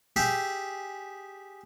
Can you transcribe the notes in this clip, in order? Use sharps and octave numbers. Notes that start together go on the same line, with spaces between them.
G4 G#4 E5